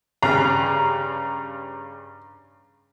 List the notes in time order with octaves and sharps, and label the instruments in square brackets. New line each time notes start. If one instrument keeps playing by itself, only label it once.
[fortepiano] G2 C#3 [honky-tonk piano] A#5